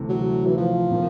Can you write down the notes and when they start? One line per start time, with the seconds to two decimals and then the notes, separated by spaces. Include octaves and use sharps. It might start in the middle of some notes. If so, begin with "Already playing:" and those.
Already playing: D2 C3 E3 A3
0.09 F#3
0.46 E3
0.57 F3
0.91 C3 D#3